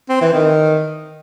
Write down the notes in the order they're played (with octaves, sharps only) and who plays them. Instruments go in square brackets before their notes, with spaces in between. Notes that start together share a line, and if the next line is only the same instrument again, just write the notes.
[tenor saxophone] C4
E3
D#3